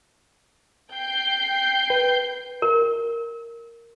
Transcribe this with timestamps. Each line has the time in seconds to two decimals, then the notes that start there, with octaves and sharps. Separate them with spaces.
0.94 G5 G6 C7
1.90 B4
2.62 A#4